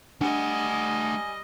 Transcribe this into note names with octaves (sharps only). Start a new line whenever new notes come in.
G3 A3 D4 D#5 F#5 G#5